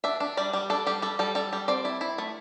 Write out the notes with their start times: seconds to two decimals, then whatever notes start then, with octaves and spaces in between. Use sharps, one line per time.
0.04 D4 E5
0.20 D4
0.37 G3 D5
0.53 G3
0.70 D4 A4
0.87 G3 G4
1.02 G3 A4
1.19 G3 A4
1.35 G3 A4
1.53 G3
1.68 C4 D5
1.85 E4
2.01 E4
2.18 A3